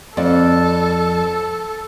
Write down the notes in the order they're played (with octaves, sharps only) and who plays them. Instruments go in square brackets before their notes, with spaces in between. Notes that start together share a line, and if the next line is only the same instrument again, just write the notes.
[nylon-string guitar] F2 D5 [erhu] A4